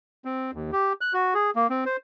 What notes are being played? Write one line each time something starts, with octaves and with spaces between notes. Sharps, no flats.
C4
D#2
G4
F#6
F#4
G#4
A#3
C4
C5